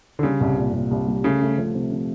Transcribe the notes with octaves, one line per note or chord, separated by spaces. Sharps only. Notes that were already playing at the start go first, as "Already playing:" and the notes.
D3
C#3 G3
C2
A#2
C2
C2
G3
C#3 A3
A3
F3
C3
C3